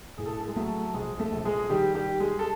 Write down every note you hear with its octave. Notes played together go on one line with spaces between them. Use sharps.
A2 G#4
A4
G#4
A4
G#3 G#4
F#3 A3 A4
A#1 G#3 G#4
A3 A4
A#1
G#3 G#4
G#4
D#3 G3 G4
G3 G4
G3
G#3 G#4
A4